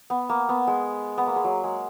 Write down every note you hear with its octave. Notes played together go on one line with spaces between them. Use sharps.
B3
A#3
B3
G#3
B3
A#3
G#3
F#3
G#3